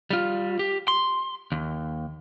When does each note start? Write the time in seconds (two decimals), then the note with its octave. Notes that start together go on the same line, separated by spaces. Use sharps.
0.10 G3 F4
0.59 G4
0.88 C6
1.52 D#2